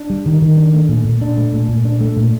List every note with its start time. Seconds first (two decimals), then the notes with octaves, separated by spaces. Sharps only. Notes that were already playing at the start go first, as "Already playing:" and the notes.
Already playing: D4
0.10 G3
0.26 D#3
0.42 D#3
0.58 D4
0.74 A3
0.89 A#2
1.05 A#2
1.21 D4
1.37 A3
1.53 A#2
1.69 A#2
1.85 D4
2.01 A3
2.17 A#2